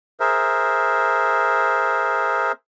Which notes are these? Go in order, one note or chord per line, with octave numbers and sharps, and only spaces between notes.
G#4 A#4 C5 E5